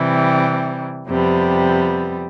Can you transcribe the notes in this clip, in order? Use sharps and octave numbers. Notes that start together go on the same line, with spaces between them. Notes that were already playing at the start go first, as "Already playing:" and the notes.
Already playing: C3 E3 G3 C4
F2 C3 G3 B3